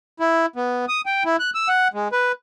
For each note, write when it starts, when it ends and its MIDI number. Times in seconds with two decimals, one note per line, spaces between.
0.20 0.46 64
0.56 0.85 59
0.88 1.01 87
1.06 1.23 79
1.25 1.36 64
1.40 1.50 90
1.55 1.68 88
1.69 1.88 78
1.94 2.08 56
2.12 2.32 71